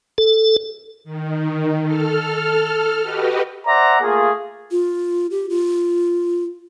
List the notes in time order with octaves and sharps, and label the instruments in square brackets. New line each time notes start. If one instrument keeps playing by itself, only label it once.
[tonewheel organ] A4
[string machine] D#3
A4 F6
F#4 G4 B4 D#5
[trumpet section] C5 D5 E5 F#5 A#5
A3 A#3 F4 G#4
[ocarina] F4
G4
F4